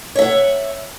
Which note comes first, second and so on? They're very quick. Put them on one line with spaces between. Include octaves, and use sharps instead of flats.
C#5 E5 F#5